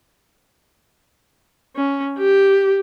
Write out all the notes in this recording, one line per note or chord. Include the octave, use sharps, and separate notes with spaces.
C#4
G4